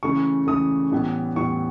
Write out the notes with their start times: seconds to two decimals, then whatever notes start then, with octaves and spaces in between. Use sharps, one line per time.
0.03 C#3 E3 A3 C#6
0.47 C#3 E3 A3 D#6
0.91 A2 E3 G3 B3
1.36 A2 E3 G3 B3 C#6